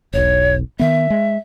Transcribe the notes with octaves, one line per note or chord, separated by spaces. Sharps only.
E1 B1 C#5
D#3 B3 E5
G#3